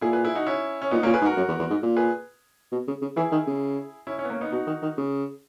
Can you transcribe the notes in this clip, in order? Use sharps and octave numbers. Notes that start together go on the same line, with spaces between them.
A#2 E4 G#4
G#4 B4
E4 G#4
D#4 F#4
C#4 E4
C#4
A#2 B3 D#4
A#2 A#3 C#4
G#4 B4
G#2
F#4 A#4
F#2
E2
E2
G#2
A#2
G#4 B4
B2
C#3
C#3
E3 E4 G#4
D#3
C#3
C#4 E4
C#4 E4
B3
A#3 C#4
B3 D#4
B2 D#4 F#4
D#3
D#3
C#3